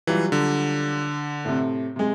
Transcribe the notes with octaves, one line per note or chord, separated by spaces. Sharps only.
E3 F#3 G3 F4
D3
A2 C3
C3 G#3